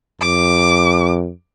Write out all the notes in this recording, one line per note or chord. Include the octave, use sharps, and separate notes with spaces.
F2 D6